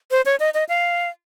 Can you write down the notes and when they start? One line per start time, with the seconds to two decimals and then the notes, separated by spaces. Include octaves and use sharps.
0.11 C5
0.26 C#5
0.40 D#5
0.54 D#5
0.69 F5